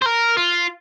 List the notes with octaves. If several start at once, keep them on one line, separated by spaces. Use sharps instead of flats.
C5
A#4
F4